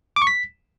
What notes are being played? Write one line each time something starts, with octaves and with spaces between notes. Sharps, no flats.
D6
C#6
B6